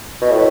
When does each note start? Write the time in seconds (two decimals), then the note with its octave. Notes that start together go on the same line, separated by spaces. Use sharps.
0.21 B2
0.31 A2